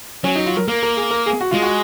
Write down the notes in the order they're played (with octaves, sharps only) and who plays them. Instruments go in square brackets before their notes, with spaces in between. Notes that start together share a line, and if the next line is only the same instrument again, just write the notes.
[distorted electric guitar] F#3 [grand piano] C#4
[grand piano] D#4
F4
A#4
[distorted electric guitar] A#3 [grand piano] A#4
[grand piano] A#4
G#4
A#4
G#4
F#4
[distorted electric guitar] G#3 [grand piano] F4
[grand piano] F#4